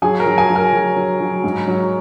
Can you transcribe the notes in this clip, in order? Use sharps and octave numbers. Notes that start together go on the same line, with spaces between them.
F#3 G#4 G#5
A#4 A#5
F#3
G#4 G#5
F#3
A#4 A#5
F#3
F#3
F#3
G#2
F#3